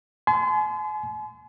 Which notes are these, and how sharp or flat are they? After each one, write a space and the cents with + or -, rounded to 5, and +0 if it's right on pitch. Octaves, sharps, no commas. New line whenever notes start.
G#5 +45 C6 -35